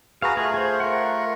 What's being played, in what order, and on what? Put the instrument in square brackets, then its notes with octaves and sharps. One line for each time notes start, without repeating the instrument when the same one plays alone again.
[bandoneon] F#4 G#4 B4 [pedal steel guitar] F5 A#5
[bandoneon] A3 F4 [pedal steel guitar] G#4
[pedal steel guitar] G#4 C5
A#4 F#5